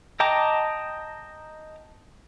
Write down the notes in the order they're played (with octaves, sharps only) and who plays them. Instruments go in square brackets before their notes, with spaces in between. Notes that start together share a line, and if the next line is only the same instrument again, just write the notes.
[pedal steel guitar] D#5 G5 A5 A#5 D6